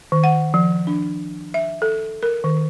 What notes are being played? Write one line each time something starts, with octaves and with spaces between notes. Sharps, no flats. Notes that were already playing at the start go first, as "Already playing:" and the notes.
D#3
F#5
F3
D4
E5
A4
A#4
D#3